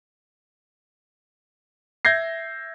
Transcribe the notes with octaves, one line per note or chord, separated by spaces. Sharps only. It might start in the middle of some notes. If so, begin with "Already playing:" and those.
E5 G6 G#6 A#6 C7